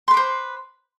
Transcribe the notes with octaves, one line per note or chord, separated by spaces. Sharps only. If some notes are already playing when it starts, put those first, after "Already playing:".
B4 C5 C6 D6